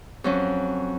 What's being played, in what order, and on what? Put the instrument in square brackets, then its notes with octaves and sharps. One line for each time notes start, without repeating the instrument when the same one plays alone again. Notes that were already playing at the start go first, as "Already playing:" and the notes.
[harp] F2 F#3 C#4